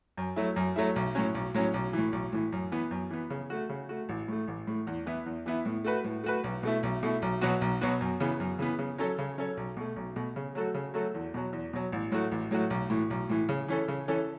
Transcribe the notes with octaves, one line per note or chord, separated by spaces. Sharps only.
F#2
F#3 A3 E4
F#2
F#3 A3 E4
B1
A2 F#3 C#4
B1
A2 F#3 C#4
B1
A2 E3
B1
A2 E3
F#2
E3 B3
F#2
E3 B3
C#3
A3 F#4
C#3
A3 F#4
A1
A2 A3
A1
A2 A3
E2
E3 B3 E4
E2
E3 B3 E4
A2
A3 F#4 B4
A2
A3 F#4 B4
B1
B2 A3 E4
B1
B2 A3 E4
B1
B2 F#3 B3 F#4
B1
B2 F#3 B3 F#4
F#2
C#3 E3 B3
F#2
C#3 E3 B3
C#3
F#3 C#4 A4 C#5
C#3
F#3 C#4 A4 C#5
B1
B2 A3
B1
B2 A3
C#3
F#3 A3 F#4 A4
C#3
F#3 A3 F#4 A4
E2
B2 F#3
E2
B2 F#3
A1
A2 F#3 A3 F#4
A1
A2 F#3 A3 F#4
B1
A2 E3
B1
A2 E3
C#3
E3 C#4 A4
C#3
E3 C#4 A4